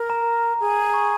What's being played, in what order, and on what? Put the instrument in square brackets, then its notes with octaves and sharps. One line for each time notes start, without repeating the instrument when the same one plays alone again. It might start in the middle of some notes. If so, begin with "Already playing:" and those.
Already playing: [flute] A#4
[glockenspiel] A#5
[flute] G#4
[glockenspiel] A#5
C#6